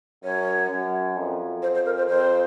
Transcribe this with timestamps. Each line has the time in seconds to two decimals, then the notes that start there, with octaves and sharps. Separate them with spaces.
0.24 F#2 C#5
0.70 F#2
1.17 F2
1.62 C5
1.75 C5
1.86 A#4
1.97 C5
2.08 F2 C5